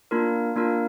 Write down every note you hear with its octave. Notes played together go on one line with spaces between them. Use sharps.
A#3 D4 F4 A#4
A#3 D4 F4 A#4